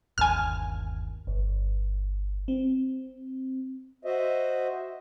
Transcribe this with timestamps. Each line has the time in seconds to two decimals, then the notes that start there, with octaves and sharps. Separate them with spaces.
0.18 G1 D#2 G#5 F6
1.27 G1
2.48 C4
4.05 F#4 C5 D#5 E5